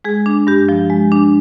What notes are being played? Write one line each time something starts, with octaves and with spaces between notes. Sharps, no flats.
G#3 G#4
D4
G2 G4
F3
G#3
D4